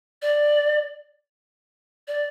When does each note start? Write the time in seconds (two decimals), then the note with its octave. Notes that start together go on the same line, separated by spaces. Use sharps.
0.22 D5
2.08 D5